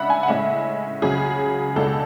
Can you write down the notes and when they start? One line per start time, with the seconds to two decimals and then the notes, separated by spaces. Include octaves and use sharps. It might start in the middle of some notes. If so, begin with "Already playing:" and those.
Already playing: C#3 G#3 D4 E5 F#5 B5
0.10 G#5
0.23 F#5
0.28 A2 G#3 C#4 E5
1.02 C#2 C#3 F#3 C#4 G#4
1.76 C#2 B2 G#3 D4 A4